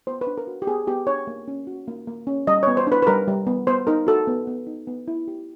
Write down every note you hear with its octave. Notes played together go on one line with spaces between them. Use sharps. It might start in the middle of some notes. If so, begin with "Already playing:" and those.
B3 C5
B4
D4
A#4
F#4
G4
B3 G#4
B3 G4
D4 C#5
A#3
C#4
F#4
A#3
A#3
C#4
G3 D#5
B3 C#5
C5
D4 B4
B4
G3 A#4
G3
B3
B3 C5
D#4 A#4
F#4 A4
B3
B3
D#4
B3
E4
G4